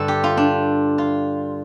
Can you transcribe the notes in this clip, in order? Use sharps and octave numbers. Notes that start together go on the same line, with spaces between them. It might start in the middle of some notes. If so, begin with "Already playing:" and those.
Already playing: G2 D3 A4
G4
F4
D4
F4